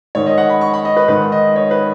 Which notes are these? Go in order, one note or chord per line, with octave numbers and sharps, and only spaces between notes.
G#2 D#3 C#5
D#5
F#5
B5
C#6
B5
D#5
B4
G#2 D#3 B4
D#5
C#5
B4